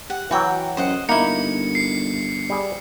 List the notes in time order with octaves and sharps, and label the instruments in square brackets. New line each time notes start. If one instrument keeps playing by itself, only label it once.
[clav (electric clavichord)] G4 [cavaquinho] F#5
[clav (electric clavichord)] E3 F#3 [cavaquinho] F#4 G5
[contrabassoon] F#2 [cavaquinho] C5 D#5 F#5
[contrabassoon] G1 [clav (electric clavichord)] A#3 [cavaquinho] D#4 E4 [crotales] C#7
[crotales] C7
[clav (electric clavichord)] G3 G#4